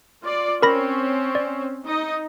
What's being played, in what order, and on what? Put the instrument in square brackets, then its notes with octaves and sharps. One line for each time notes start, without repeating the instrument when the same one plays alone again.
[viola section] F4 D5
[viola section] C4 C#4 [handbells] A#4 B5 A#6
[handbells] D5
[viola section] D#4 D#5